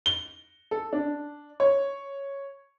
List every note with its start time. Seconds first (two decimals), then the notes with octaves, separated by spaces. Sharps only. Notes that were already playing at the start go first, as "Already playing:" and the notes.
0.06 G7
0.71 A4
0.93 D4
1.60 C#5